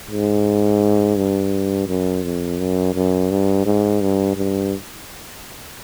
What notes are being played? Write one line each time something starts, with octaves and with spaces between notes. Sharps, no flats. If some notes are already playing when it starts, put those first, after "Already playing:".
G#2
G2
F#2
F2
F#2
F#2
G2
G#2
G2
G2